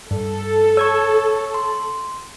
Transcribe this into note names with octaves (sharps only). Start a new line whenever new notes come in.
G2 A4
C#5 C#6 E6 G#6
C6